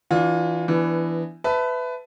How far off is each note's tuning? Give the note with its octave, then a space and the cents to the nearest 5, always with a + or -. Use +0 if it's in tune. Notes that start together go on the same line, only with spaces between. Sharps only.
E3 +0 D4 +0 F4 +25
E3 +15 B3 +0 D4 +10
B4 +20 E5 +0 A5 +0